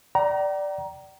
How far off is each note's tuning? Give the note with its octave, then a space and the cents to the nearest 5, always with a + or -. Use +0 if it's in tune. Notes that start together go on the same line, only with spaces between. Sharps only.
D5 +0 G5 -40 A#5 +15